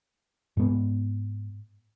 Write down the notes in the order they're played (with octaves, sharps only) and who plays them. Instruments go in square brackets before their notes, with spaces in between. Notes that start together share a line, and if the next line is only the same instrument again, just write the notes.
[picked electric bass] G#2 B3